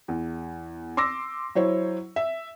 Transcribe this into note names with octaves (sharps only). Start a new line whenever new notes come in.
E2
C6 D6 E6 A#6
F#3 E4 C5 C#5
E5